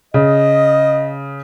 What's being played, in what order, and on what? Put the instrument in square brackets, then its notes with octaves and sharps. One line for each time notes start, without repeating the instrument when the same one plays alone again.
[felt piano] C#3 [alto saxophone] D#5